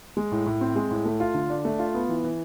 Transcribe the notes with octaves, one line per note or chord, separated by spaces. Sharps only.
G#3
A2
A2
C4
G#3
A2
A3
F4
D3
D4
A3
F4
B3
E3
E3